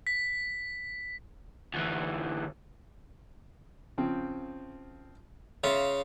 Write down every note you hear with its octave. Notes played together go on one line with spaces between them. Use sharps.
B6
D2 E3
C#3 F3 C4
C#3 F4 E5